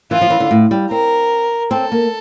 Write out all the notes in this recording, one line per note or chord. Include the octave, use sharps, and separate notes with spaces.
E3 F4
F3
E3
D3
A2
G3
C4 A#4
C4 A4
A#3